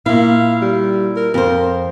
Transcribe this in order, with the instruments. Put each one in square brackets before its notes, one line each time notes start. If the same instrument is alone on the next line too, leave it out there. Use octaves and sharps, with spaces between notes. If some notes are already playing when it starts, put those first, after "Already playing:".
[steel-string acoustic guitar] A#2 E4 [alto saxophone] F5
[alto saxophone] G3
A#4
[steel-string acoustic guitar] F2 C5 [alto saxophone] A#4